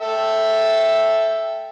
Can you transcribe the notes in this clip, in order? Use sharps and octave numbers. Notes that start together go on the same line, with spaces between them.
A4 E5 G5